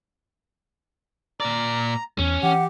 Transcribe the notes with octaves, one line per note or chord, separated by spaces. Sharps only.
A#2 D5 A#5
E2 C#4
E3 G4 F#5